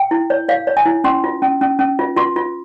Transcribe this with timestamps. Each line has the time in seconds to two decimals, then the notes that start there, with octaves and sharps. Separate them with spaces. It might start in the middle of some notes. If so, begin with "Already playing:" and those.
Already playing: G5
0.11 E4
0.30 C#5
0.48 C#5 F5
0.67 C#5
0.77 G#5
0.86 E4
1.04 C#4 C6
1.24 F4
1.42 C#4
1.61 C#4
1.79 C#4
1.99 F4
2.16 F4 C6
2.36 F4